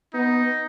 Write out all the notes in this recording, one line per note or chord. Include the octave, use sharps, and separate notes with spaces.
B3 D#4